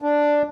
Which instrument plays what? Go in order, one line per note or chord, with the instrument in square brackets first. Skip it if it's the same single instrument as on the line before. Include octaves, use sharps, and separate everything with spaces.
[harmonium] D4